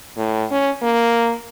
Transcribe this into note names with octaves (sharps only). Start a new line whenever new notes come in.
A2
C#4
A#3